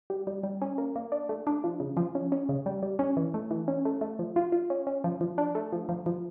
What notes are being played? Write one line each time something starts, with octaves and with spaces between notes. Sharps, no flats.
G3
G3
G3
C#4
A#3
A#3
D4
A3
D4
F3
C#3
F3
C#4
C#4
C#3
G3
G3
C#4
E3
A3
E3
C#4
A3
A3
F3
F4
F4
C#4
C#4
F3
F3
D4
A3
F3
F3
F3